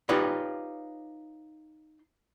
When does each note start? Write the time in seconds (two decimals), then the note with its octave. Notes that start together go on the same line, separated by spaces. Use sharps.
0.09 D#4 F4 G4 B4 C#5 D5